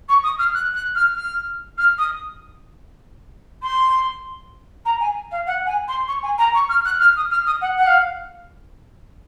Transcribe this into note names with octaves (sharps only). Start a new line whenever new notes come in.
C#6
D#6
F6
F#6
F#6
F6
F6
F6
D#6
C6
A#5
G#5
F5
F#5
G#5
C6
C#6
G#5
A#5
C#6
F6
F#6
F6
D#6
F6
D#6
F#5
F#5
F5